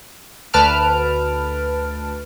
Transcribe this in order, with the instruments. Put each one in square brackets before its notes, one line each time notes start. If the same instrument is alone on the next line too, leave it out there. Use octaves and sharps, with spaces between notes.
[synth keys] D2 B4 A5 F6 D7